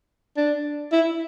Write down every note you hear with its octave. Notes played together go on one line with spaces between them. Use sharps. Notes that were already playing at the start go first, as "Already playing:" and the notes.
D4
E4